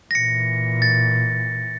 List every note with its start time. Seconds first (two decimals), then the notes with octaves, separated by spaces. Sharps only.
0.11 A#2 E3 A#6 C#7
0.82 A6